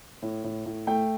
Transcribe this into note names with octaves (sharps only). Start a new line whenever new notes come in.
A2
A2
A2
A3 G5